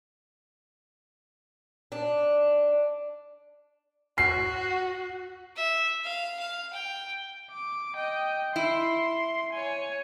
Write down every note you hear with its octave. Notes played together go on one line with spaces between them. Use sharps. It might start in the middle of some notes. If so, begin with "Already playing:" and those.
D4
F#4 C7
E5
F5
F5
G5
D6
D#5 G5
E4 C6
C#5 G#5